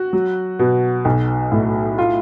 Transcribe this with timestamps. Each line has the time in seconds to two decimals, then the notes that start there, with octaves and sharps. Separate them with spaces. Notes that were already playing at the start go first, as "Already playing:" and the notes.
Already playing: F#4
0.13 F#3
0.59 B2
1.05 B1
1.52 A2
1.98 F4